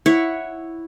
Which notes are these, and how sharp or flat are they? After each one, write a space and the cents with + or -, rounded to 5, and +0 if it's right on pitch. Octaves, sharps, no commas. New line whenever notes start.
E4 +0 C#5 +0 F#5 +0